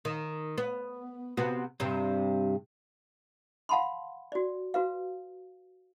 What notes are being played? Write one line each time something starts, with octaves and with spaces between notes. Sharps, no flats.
D#3
B3
C3 B3 F#4
G2 C3
F5 F#5 A5 B5 C6
F#4 D5
F#4 B4 F5